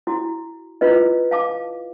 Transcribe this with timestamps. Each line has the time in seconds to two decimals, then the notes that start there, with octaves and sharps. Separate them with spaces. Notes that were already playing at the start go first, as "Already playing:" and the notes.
0.07 E4 F#4
0.81 E4 F4 B4 D#5
1.31 F5 A5 D6